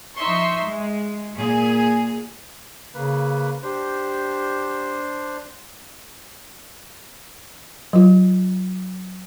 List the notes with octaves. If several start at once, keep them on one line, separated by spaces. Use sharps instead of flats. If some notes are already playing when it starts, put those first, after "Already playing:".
F3 D#4 E5 C6 C#6
G#3
A#2 G#4
C#3 A#3 B4
D4 G4 C5
F#3 F4